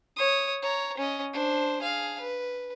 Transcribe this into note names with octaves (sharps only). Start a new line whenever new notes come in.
C#5 D#6
C#5 A#5
C#4 D#5
D4 C5
G#4 F5
B4